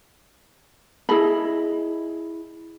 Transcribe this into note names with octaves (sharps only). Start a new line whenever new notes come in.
E4 G#4 D#5 B5